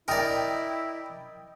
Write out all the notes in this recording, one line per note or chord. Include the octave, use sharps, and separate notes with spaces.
E4 A#4 D5 D#5 G5 D#6